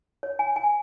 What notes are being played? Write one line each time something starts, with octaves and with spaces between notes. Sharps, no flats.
C#5
G#5
G#5